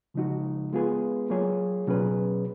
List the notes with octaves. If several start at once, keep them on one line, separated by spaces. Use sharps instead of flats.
C#3 F3 G#3 D#4 F#4
G#3 B3 F4 G#4 B4
F#3 A#3 F4 G#4 C#5
B2 F#3 C#4 G#4 B4